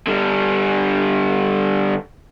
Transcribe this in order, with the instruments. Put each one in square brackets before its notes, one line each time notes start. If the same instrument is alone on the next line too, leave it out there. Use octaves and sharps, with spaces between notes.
[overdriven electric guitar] D3 G3